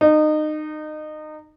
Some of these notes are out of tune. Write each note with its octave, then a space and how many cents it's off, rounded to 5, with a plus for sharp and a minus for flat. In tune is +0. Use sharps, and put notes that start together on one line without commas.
D#4 -25